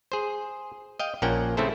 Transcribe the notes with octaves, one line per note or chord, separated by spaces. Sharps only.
G#4 C5
D#5 F5 G5
A#1 A#2 A#3 C#4 F#5 G5
C#3 A3 C4 E4 A4 C5